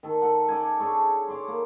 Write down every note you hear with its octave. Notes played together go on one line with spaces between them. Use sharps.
D#3 A4
A4 F#5
A4 D5 D#5 G#5
D4 G#4 A4 C#5
C#5 D5 C6
A#3